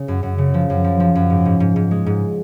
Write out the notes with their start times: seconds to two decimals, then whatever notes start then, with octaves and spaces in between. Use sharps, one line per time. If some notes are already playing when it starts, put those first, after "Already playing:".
Already playing: C#3
0.08 F#2
0.23 F#2
0.38 C#3
0.54 F3
0.70 F#2
0.84 F3
1.00 F3
1.15 F#2
1.30 G#2
1.45 G#2
1.60 G#2
1.76 G#2
1.91 G#3
2.06 G#2